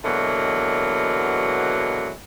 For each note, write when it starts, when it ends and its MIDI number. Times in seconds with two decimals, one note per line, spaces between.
0.04 2.10 47
0.04 2.10 50
0.04 2.10 52
0.04 2.10 54
0.04 2.10 56
0.04 2.10 58